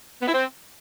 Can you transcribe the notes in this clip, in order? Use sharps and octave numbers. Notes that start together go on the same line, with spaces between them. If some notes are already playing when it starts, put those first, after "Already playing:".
B3
E4
C4